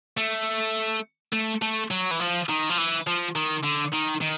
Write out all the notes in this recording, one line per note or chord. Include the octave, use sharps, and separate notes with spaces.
A3
A3
A3
F#3
E3
F3
D#3
F3
E3
F3
D#3
D3
D#3
D#3